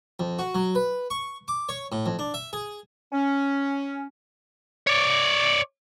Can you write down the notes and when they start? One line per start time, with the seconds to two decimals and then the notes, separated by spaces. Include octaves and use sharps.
0.19 F2
0.39 F#4
0.55 F#3
0.75 B4
1.10 C#6
1.48 D6
1.69 C#5
1.92 A2
2.06 F2
2.19 D4
2.34 E5
2.53 G#4
3.13 C#4
4.87 C#5 D5